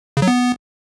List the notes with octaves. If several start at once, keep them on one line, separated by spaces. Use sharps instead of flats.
C#3
F#3
B3